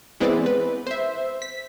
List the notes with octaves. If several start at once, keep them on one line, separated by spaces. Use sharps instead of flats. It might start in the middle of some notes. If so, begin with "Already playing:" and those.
E3 G#3 B3 C4 B4 D5
B4
C5 E5
B6